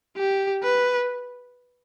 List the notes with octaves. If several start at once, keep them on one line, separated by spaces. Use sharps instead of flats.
G4
B4